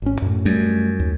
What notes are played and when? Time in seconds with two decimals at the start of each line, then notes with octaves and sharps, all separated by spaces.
0.02 G#1 C#4
0.22 F#2 A2
0.45 F#2 G3 A3
1.00 D#2